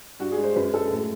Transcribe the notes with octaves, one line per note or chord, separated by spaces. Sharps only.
G2 F#4
G#4
G#3
C5
F#2 B4
G#3 A4
A2